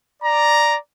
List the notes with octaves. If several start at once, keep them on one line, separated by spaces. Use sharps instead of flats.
D5 A#5